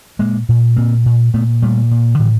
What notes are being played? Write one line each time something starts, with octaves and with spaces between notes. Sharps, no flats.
A#2 G#3 A#3
A#2
A#2 A#3 C4
A#2
A#2 A3 B3
A#2 G3 A3
A#2
A2 D3 E3